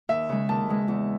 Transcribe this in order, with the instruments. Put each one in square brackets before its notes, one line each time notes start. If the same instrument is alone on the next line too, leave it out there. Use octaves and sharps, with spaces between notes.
[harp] D#2 [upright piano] E5
[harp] C#3 G#3
[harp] D#2 [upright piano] A5
[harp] C#3 G#3
E2